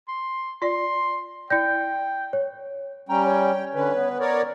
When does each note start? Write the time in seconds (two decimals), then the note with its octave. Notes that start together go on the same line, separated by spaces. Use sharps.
0.08 C6
0.62 F4 D5 C6
1.50 E4 D5 G5 G6
2.33 C#5
3.09 G3 C#4 G5 A#5
3.26 C#5
3.75 D3 C#4 B4
3.95 B3
4.20 A#4 C#5 D5